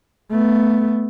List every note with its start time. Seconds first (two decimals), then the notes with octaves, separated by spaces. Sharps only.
0.31 A3 B3